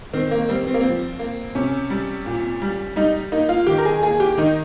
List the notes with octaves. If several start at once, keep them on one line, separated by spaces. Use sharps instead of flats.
D#3 C4
A#3
G3 C4
C4
A#3
F3 C4
A#3
C3 C#4
G3
A#2
G3
G3 D#4
A#3 D#4
F4
D#3 G4
A#4
G#4
A#3 G#4
G4
D#3 D#4